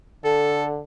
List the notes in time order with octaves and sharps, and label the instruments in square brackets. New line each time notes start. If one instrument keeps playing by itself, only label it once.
[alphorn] D3 [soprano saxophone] A4